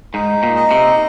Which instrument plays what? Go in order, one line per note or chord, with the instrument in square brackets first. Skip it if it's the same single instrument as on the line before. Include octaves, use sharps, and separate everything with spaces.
[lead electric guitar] G#2 [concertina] D#4
[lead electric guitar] A#2
[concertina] D#5
[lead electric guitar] C3